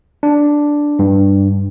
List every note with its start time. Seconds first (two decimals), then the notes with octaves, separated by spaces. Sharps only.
0.23 D4
0.99 G2